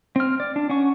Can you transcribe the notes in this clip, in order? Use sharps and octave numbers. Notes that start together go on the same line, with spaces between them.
C4 F6
D5
D4
C#4 F#5 C#6